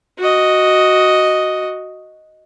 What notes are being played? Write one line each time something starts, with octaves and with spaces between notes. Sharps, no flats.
F#4 D#5